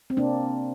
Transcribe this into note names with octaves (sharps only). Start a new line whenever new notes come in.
C4
C3 A#3 D4